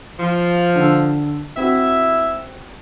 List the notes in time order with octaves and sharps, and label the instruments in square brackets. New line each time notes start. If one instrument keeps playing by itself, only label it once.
[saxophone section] F3
[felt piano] D3 E6
[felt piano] C4 F#4 [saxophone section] E4 E5